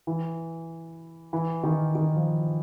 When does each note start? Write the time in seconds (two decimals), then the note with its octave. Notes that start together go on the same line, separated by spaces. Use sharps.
0.07 E3
1.33 E3
1.64 D#3
1.95 D#3
2.16 F3